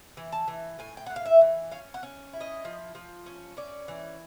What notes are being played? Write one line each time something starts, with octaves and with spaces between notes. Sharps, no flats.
E3
A5
E3
A2 G#5
G5
A2 F#5
F5
E5
E3
C#4 F5
F#5
C#4
E4
D#5
F3
F3
C#4
C#4 D5
E3